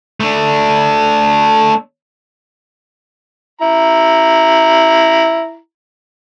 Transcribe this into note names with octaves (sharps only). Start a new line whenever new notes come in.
A3 D4
E4 A#5